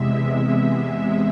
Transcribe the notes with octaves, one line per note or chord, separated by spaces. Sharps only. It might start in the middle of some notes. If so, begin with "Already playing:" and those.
Already playing: E2 C3 G#3 E5